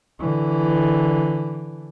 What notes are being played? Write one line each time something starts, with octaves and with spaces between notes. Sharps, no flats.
D3 E3